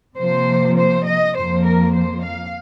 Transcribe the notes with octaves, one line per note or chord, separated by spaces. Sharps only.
C3 F3 A#3 C5
C5
D#5
F2 F3 A#3 C5
A#4
C5
F5